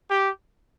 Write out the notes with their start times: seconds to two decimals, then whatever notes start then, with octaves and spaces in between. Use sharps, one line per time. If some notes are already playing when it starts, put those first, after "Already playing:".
0.10 G4